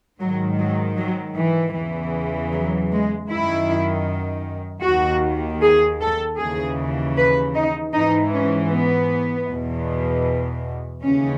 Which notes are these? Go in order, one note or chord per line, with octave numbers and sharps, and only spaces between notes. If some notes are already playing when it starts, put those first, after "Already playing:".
G#2 D#3 F#3
F#3
F#3
E3
E2 C#3 E3
F#3
G#3
F#2 D#3 E4
D#2 D#3 F#4
G#4
A4
D#2 C#3 E3 G#4
B4
D#4
G#2 E3 D#4
C#4
B3
E2 B2
D#2 C#3 E3 C#4